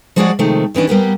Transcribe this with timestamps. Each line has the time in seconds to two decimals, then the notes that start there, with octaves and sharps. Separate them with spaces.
0.16 F3 G#3 F#4 G#4 C#5 D5
0.39 C3 D#3 F3 G#3 A3
0.74 D#3 E3 C#4 D4
0.87 G3 A#3 B3 G4